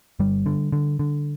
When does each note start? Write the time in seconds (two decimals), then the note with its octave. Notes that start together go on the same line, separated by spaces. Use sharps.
0.20 G1 G3
0.46 D3
0.73 D3
0.99 D3